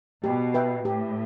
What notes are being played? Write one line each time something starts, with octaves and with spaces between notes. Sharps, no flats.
B2 G4
B4 E5 G5
A2 G4